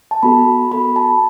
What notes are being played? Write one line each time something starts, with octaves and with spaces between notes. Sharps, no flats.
A5
B3 F#4 A4 B5
B3 F#4 A4 B5
A5